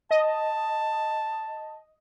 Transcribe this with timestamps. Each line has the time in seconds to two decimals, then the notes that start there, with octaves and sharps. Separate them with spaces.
0.11 D#5 A5